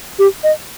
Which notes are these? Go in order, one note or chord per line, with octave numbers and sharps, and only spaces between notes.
G4
D#5